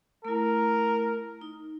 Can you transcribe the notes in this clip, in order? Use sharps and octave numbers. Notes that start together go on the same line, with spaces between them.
A3 E4 A#4
D#4